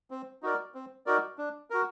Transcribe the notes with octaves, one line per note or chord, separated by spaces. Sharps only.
C4
D#4 F#4 A#4 D5
C4
D#4 F#4 A#4 D5
D4
F#4 A#4